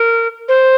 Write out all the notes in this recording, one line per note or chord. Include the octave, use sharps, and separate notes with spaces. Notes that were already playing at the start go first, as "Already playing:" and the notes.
Already playing: A#4
C5